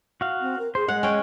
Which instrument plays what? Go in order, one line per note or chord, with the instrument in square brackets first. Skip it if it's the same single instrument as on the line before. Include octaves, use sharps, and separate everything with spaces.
[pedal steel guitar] F#4 F5
[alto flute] C4
A#4
[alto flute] G#4 [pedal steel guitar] C5
[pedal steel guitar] G#3 [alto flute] D#5 [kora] F#5
[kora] C#4 G5